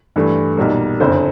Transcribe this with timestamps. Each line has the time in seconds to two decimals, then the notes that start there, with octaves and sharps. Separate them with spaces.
0.16 G2 E3 A3
0.57 B1 A#2 G3 A#3
1.00 F#1 F2 D3 C5